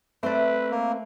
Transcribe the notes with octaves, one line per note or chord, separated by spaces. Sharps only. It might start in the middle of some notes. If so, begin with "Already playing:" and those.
A3 C4 B4 C5 D5
A#3